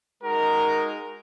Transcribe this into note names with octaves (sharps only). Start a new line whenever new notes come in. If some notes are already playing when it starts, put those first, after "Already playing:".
G#3 D#4 F#4 A#4